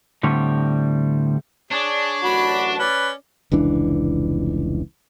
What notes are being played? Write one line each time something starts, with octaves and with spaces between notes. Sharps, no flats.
A2 D3 G3 C4 C#5
D4 G#4 C#5
A1 F#2 F#4 B5
C#4 B4 D5
F1 C#2 E3 D4